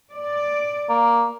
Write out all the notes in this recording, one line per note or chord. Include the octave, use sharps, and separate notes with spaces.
D5
A#3